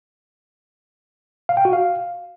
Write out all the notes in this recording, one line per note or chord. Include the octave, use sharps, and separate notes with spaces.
F5
G5
F#4
F5